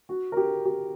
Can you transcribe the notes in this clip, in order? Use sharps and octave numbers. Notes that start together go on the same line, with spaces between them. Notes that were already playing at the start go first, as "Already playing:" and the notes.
F#4
A#4
G4
G4